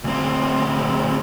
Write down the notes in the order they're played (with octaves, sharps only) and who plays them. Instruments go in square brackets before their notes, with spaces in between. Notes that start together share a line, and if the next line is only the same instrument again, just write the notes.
[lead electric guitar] D2 C4